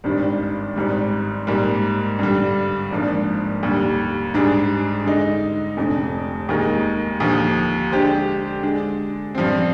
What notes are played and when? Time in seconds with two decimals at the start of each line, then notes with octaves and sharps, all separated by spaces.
0.04 G#1 G2 D#3 G3 D4
0.76 G#1 G#2 G3
1.47 G#2 G3 A#3
2.19 G2 D3 G3
2.91 G#1 G#2 F3 A#3 D4
3.63 D#2 D3 G3
4.34 G#2 G3 D4 G#4
5.05 D3 G#3 D#4
5.77 F1 F2 D3
6.49 D#2 D#3 G#3 D#4 A#4
7.20 D#2 D3 F3
7.91 D3 G#3 D4 G4 C5
8.63 D3 G#3 D4
9.35 G2 F3 C4